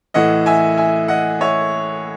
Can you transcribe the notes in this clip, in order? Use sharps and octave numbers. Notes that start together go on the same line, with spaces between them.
A2 E3 D#5 F#5
E5 G#5
E5 G#5
D#5 F#5
C#5 E5